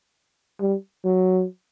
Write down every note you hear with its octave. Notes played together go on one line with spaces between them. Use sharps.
G3
F#3